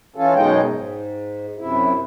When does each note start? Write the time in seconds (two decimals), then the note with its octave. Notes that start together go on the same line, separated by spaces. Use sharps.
0.16 E3 C#4 F4 A4
0.35 F#2 B2 G#3 C#4 D#4 G5
0.68 G#2
1.59 F#2 C3 E4